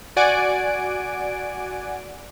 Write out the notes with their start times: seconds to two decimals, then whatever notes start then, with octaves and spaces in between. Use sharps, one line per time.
0.16 F#4 D5 F#5 G#5 D7